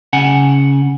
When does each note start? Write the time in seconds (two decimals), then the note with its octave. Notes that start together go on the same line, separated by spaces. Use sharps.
0.13 C#3 F#5 G#5